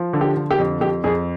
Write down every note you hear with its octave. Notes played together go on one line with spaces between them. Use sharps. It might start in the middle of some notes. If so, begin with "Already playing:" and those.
Already playing: F3
D3
G4
D3
G4
F2
F2 G4
F2 G#4